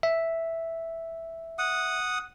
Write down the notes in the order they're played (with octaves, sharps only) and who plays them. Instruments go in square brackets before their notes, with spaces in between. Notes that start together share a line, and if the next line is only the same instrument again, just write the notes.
[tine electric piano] E5
[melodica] F#5 D#6